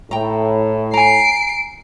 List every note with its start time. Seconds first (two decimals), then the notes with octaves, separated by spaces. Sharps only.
0.11 A2 G5 A#5
0.94 G#5 A#5 C7 D7